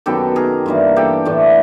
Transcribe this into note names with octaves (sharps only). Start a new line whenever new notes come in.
F#2 D#3 F#3 B3 G4 A4
G#4 A#4
G2 E3 G3 A#3
G4 A4
A2 E3 A3 D4